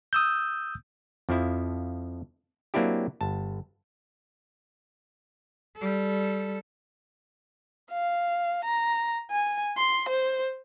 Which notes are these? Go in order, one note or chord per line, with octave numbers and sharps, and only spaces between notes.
D#6 E6 G6
F2 F3 E4
F#3 A#3 C4 D4 E4 G4
G1 A5
G3 A4
F5
A#5
G#5
C6
C5